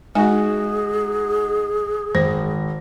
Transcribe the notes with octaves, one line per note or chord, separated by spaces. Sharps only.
G#3 D#4 F#4 G#4 G#5
G#1 C5 A#6